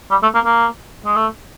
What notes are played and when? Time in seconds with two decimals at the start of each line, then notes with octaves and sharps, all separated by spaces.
0.11 G3
0.23 A3
0.34 A#3
0.45 A#3
1.05 G#3
1.16 A3